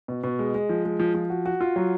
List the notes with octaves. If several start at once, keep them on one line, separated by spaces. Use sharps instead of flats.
B2
B2
G#3
G#3
F3
G#3
F3
F3
F#4
F#4
F4
F#3